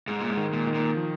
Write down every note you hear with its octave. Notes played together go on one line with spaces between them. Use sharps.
G#2 G#3
A#2
G#2
D#3
A#2
D#3
A#2
F3